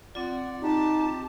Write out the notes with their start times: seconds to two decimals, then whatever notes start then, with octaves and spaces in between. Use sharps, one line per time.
0.15 C4 F4 D5 F#5
0.62 D#4 G4 A5